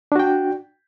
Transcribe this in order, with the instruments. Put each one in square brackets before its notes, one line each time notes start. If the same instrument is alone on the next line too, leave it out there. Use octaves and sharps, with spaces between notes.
[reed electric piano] D4
F#4
G5